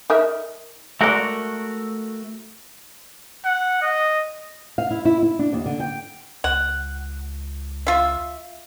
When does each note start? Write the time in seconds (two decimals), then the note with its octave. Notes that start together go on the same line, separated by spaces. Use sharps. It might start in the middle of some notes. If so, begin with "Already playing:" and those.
0.10 D#4 A#4 E5
1.01 G#3 A3 F#4 A#4 D5
3.46 F#5
3.82 D#5
4.78 F5
4.91 E4
5.05 E4
5.23 E4
5.39 D4
5.53 D#2
5.66 D3
5.80 G5
6.44 C#2 F#5
7.87 F4 E5